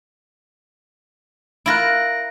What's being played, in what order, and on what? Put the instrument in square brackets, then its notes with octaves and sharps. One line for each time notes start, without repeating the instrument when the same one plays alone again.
[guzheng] E4 F4 A#4 [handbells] F#6 A#6 D7